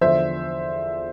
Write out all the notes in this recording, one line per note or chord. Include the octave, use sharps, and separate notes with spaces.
E2 D3 F3 C5 E5